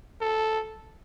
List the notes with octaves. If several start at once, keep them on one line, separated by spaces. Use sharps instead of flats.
A4